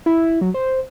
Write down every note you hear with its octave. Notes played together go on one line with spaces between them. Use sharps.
E4
F#3
C5